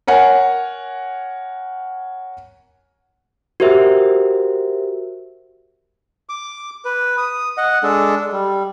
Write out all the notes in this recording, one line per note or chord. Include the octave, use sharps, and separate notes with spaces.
A#4 C#5 F#5 G#5
F#4 G4 A#4 C5 E5
D6
B4
D#6
D#5 F#5
G#3 D4 A4
G3